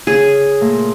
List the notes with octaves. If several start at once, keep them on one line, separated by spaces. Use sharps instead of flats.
C#3 G#4
A#2 A3